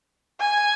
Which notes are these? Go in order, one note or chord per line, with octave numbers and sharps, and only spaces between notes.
G#5